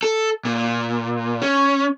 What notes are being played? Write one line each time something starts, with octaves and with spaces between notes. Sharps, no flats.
A4
A#2
C#4